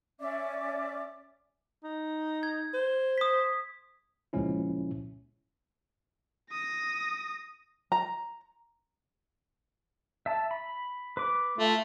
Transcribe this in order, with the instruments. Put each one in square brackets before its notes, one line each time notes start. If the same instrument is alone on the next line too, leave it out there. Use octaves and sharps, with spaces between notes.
[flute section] C#4 D5 E5 D6
[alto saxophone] D#4
[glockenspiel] G#6
[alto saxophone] C5
[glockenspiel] D#6 B6
[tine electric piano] C#2 A#2 F3 G#3 C#4 E4
[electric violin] D#6 A#6
[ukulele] A#5
[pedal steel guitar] E5 A5
B5
B4 D6
[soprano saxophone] A3 [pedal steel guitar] F4